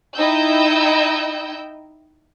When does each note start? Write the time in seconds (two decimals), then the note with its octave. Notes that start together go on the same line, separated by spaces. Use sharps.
0.16 D#4 E4 D#5 G5 E6 G6